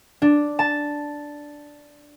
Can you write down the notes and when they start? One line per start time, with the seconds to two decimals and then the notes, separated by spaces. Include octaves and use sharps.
0.22 D4
0.59 A5